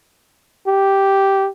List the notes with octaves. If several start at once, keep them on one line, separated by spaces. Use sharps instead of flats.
G4